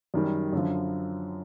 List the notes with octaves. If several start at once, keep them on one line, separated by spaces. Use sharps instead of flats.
F#2 D#3 G3
F#2 D3 F3